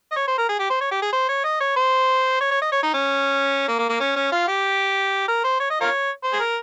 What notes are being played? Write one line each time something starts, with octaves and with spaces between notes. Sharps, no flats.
D#5
C#5
C5
A#4
G#4
G4
C5
C#5
G4
G#4
C5
C#5
D#5
C#5
C5
C#5
C#5
D#5
C#5
D#4
C#4
A#3
A#3
A#3
C#4
C#4
F4
G4
A#4
C5
C#5
D#5
F4 A#4 C#5
C5
G#4
A#4